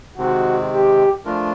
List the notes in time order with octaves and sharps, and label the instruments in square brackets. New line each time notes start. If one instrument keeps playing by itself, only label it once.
[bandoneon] C3 D#3 G#3 C4 [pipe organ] F#4
[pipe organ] G4
[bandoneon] F3 A3 D4 F4 A#4